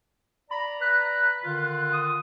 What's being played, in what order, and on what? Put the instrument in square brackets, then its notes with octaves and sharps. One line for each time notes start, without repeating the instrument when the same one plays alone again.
[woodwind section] D5 A#5 [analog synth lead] B5
[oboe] B4 [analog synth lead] F#6
[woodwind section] D3 D#3 F4
[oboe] D#6